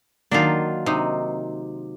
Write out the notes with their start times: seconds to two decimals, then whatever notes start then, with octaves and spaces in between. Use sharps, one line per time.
0.31 D#3 F#3 A#3 D4 F4
0.86 C3 D#4